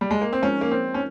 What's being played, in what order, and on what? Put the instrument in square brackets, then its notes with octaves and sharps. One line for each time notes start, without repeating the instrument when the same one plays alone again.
[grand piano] G3
G#3
A#3
C4
[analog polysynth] F3 G#3 D#4 A#4 C#5 [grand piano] C#4
[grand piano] A#3
C4
C#4